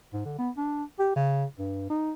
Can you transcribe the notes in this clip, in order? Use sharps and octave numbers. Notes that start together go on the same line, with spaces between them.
G#2
D3
B3
D4
G4
C#3
G2
D#4